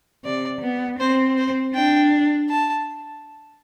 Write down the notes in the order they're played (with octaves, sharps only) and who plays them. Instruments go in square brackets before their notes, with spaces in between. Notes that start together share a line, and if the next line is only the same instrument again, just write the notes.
[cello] C3 [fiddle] D5
[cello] B3
[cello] C4 [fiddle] C5
[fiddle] C5
[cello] D4 [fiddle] G5
[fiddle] A5